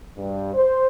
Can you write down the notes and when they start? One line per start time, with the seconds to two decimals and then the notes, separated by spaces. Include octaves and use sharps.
0.17 G2
0.54 C5